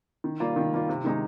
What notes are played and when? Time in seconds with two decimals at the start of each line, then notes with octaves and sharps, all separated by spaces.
0.24 D#3
0.40 G3 A#3 F4
0.56 D#3
0.73 G3 A#3 F4
0.89 C3
1.04 D#3 G#3 D#4 G#4